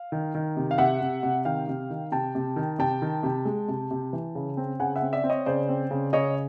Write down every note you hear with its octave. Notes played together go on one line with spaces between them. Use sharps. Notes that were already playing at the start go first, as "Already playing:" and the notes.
Already playing: F5
D#3
D#3
C3
F5
C3 E5 F#5
C3
C3
D#3 F5 G5
C3
D#3
C3 G5 A5
C3
D#3
C3 G5 A5
D#3
C3
G#3
C3
C3
E3
C#3
C4
C#3 F#5 G#5
E5 F#5
C4
D5 E5
C4
C#5 D#5
C#3 C5 D5
C4
C#3
C#3 C#5 D#5